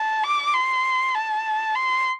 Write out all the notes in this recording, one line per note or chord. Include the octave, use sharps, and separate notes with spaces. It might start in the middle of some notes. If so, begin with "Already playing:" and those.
Already playing: A5
D6
C6
A5
C6